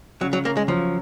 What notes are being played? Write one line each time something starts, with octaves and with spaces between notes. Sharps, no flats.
C#3 F#3
F#3
A#3 C#4
G#3
F3 F#3